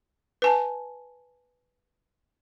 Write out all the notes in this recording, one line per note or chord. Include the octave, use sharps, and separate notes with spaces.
B4 G#5 A5